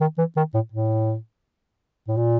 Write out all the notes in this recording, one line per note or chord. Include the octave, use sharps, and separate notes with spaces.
D#3
E3
D#3
A2
A2
A2
A#2